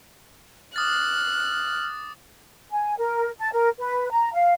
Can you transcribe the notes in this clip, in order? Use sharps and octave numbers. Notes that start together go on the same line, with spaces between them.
D6 D#6 F6 F#6 A6
G#5
A#4
A5
A#4
B4
A#5
F5